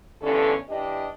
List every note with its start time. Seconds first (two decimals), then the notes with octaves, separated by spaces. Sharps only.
0.21 G2 D3 E3 B3 C#4 A4
0.68 E3 D4 G4 D#5